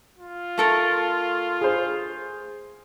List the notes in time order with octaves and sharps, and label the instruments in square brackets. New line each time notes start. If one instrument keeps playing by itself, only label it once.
[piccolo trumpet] F4
[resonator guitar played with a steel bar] A3 A4 A#4
[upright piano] G#4 C5